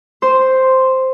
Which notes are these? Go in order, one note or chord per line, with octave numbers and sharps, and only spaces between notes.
C5